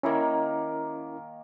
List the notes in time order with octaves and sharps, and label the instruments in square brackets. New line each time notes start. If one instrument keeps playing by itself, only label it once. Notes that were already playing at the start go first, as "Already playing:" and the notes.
[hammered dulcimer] D#3 A#3 [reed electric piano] C#4 E4 A#4